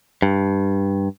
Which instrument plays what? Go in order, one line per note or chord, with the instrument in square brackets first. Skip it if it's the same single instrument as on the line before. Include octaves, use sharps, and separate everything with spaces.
[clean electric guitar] G2